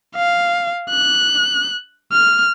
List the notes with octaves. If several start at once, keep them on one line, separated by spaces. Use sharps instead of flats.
F5
F#6
F6